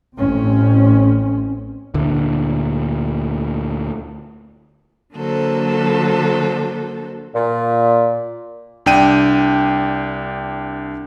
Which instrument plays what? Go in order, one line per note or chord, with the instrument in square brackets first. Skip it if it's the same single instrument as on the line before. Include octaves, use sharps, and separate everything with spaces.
[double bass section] A1 C4 C#4
[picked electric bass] D2 A#2 D3
[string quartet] D3 F#3 A#3 F#4 A4 C5
[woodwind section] A#2
[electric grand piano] C2 D4 G5 D#7